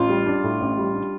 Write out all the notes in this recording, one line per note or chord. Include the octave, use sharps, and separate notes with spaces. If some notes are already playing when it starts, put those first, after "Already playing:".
Already playing: A1 F4
G3
D4
A2
A1
G3
D4